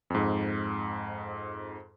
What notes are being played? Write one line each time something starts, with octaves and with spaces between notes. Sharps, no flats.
F2 G#2